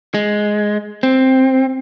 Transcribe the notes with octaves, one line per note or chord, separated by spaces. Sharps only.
G#3
C4